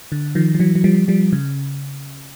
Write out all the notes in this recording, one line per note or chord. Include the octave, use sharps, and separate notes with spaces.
D3
D#3 F3
F3
E3 F#3
F#3
F3 G3
F3 G3
C#3